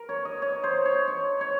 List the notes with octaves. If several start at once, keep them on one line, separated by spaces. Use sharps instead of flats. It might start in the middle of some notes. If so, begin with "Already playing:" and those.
Already playing: A#4
C#5
D#5
C#5
C5
C#5
C#5
C#5